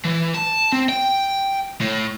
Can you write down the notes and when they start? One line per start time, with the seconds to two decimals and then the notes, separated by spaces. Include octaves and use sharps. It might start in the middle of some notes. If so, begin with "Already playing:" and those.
0.05 E3
0.34 A5
0.72 C4
0.89 G5
1.81 A2